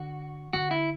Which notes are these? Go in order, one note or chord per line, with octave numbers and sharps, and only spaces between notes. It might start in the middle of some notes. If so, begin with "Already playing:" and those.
Already playing: D3 F#4
D3 F#4
E4